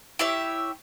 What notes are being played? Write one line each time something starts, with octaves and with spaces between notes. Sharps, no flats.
E4 G4 C#5 E5